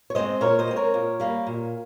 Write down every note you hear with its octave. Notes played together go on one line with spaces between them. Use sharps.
C#5
G#3 C4 C5 D#5
A#2 A#4 C#5
C5 D#5
G#3 C4
A#4 C#5
A#2
G3 A#3
A#2